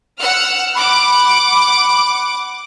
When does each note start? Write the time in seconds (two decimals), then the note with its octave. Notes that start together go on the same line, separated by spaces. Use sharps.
0.20 F#5 E6 F6
0.75 F#5 B5 D6